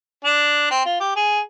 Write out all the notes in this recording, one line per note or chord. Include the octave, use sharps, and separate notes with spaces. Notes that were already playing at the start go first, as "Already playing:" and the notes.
D4
C4
F4
G4
G#4